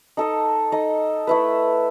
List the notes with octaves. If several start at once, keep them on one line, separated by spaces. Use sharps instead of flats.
D#4 A4 D#5
D#4 A4 D#5
A3 E4 B4